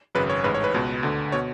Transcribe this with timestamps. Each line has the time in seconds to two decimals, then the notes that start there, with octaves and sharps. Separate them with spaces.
0.15 G#1 F#2 C#3 B4
0.30 C#5
0.44 A1 G#2 B4
0.54 C#5
0.64 B4
0.74 C#2 B2
1.03 D2 D3
1.32 B2 C#5